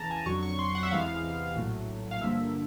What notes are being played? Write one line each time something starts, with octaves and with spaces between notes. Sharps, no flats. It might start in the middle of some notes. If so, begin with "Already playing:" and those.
Already playing: E2 C#3 E3 A5 A#5
G#5
F2 D3 F#3 C#6
C#6
C6
F#5
E5
E2 C3 E3 G#3 B3 F5
A#1 A2 F#3 A3
F5
G2 D3 F3 A#3 E5